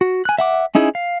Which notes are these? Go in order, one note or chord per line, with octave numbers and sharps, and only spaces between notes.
F#4
G#5 F#6
E5 F#5 D6
C#4 D#4 E4 G#4
F5